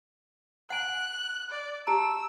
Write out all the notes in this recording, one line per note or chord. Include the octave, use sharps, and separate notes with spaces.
F#5 G#5 F#6
D5
G4 A5 A#5 E6